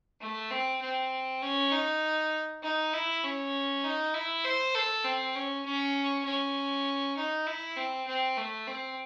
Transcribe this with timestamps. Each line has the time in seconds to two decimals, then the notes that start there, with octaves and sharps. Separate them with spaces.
0.21 A3
0.51 C4
0.82 C4
1.42 C#4
1.72 D#4
2.63 D#4
2.93 E4
3.23 C#4
3.84 D#4
4.14 E4
4.44 C5
4.75 A4
5.05 C4
5.36 C#4
5.65 C#4
6.25 C#4
7.17 D#4
7.47 E4
7.76 C4
8.07 C4
8.37 A3
8.67 C4